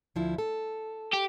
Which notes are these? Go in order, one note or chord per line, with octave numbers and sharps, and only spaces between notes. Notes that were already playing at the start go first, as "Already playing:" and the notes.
D2 F3 E4
A4
G4